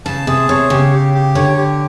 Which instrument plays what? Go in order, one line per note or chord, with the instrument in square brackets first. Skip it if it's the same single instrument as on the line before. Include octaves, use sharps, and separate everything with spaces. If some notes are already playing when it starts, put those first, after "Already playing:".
[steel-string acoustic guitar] C#3 [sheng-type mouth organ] A5
[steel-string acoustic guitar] C3 [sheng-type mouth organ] G#4
[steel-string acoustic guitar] C3 [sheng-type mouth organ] C#5
[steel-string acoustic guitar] C#3 [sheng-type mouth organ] G4
[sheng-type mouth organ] G4
G4
[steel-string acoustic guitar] D3 [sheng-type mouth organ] C#5
[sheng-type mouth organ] G4